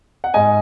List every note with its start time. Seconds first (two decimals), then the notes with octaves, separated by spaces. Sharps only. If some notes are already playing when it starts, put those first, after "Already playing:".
0.24 F#5
0.34 G#2 G#3 D#5 G#5